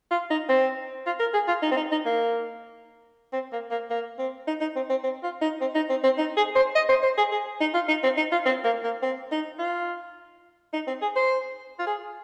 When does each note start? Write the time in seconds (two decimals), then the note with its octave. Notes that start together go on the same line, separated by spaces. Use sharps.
0.11 F4
0.31 D#4
0.49 C4
1.06 F4
1.20 A#4
1.34 G#4
1.48 F4
1.62 D#4
1.72 C4
1.77 D#4
1.92 D#4
2.06 A#3
3.33 C4
3.53 A#3
3.71 A#3
3.90 A#3
4.19 C4
4.48 D#4
4.61 D#4
4.76 C4
4.90 C4
5.04 C4
5.23 F4
5.42 D#4
5.61 C4
5.75 D#4
5.90 C4
6.04 C4
6.18 D#4
6.37 G#4
6.56 C5
6.76 D#5
6.89 C5
7.03 C5
7.18 G#4
7.32 G#4
7.61 D#4
7.74 F4
7.88 D#4
8.03 C4
8.18 D#4
8.32 F4
8.46 C4
8.64 A#3
8.84 A#3
9.03 C4
9.32 D#4
9.59 F4
10.74 D#4
10.88 C4
11.02 G#4
11.16 C5
11.79 F4
11.87 G#4